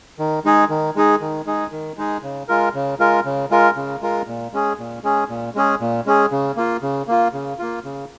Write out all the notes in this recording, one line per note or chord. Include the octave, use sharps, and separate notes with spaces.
D#3
G#3 D#4 G#4
D#3
G#3 D#4 G#4
D#3
G#3 D#4 G#4
D#3
G#3 D#4 G#4
C#3
G#3 F4 A#4
C#3
G#3 F4 A#4
C#3
G#3 F4 A#4
C#3
G#3 F4 A#4
A#2
G#3 C#4 G#4
A#2
G#3 C#4 G#4
A#2
G#3 C#4 G#4
A#2
G#3 C#4 G#4
C#3
A#3 F4
C#3
A#3 F4
C#3
A#3 F4
C#3